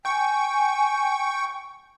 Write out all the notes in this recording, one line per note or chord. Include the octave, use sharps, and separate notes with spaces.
G5 G#5 C#6